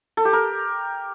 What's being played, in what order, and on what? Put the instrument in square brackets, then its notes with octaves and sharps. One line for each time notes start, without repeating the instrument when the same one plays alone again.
[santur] A4
G4
A#4